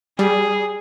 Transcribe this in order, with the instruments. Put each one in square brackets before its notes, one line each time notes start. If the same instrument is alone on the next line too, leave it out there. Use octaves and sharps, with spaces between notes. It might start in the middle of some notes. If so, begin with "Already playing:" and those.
[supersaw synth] G3 [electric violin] G#4